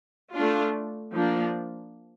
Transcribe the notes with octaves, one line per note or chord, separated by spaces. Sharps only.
A3 D4 F4
F3 A#3 D4